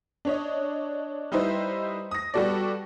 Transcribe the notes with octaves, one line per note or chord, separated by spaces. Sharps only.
D4 C#5 D#5
G3 D#4 E4 B4 C5 D#5
D#6 A#6
G3 B3 F#4 A4 D5